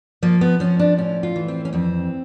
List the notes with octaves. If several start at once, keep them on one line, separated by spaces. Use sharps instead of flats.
F3 A#3
B3
F3 C#4
D4
A2 C#4
F4
E3
C4
C#4
F2 C4